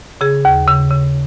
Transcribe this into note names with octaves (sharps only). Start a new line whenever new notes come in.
C#3 G#4
D#2
C#3
C#3